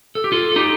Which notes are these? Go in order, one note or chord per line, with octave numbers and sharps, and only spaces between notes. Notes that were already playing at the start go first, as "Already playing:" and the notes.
A4
G4
F4 A4
A4
D#4 G4